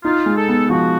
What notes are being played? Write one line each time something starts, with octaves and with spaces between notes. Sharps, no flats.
D#4 F4
G#3
A4
B3
F3 F#4